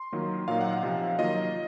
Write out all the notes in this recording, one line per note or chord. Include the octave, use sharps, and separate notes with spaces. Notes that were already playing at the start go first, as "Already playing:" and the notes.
Already playing: C6
D#3 F#3 A#3 F4
A#2 F#3 A#3 D#4 F5
F#5
F5
C3 F3 C4 D#4
D#3 F#3 A#3 F4 D#5